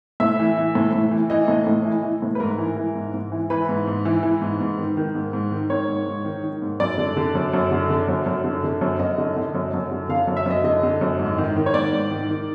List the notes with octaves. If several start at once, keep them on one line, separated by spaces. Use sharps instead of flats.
A2 E5
E3
E3
A2
A2
E3
E3 D#5
A2
A2
E3
E3
A2
B4
G#2 A#4
E3
E3
G#2
G#2
E3
E3 B4
G#2
G#2
E3
E3
G#2
G#2
D#3
D#3
G#2
G#2
D#3
D#3 C#5
G#2
G#2
D#3
D#3
G#2
F#2 D5
D3
D3
F#2
F#2
D3
D3
F#2
F#2
D3
D3
F#2
F#2 D#5
D3
D3
F#2
F#2
D3
D3 F5
F#2
E5
F#2 D#5
D3 D#5
D3
F#2
G#2
D#3
D#3
C#5
G#2 D5
G#2
D#3
D#3